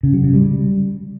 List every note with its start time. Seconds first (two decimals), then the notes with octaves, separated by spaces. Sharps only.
0.03 C#3
0.14 F#3
0.24 C#3
0.34 G3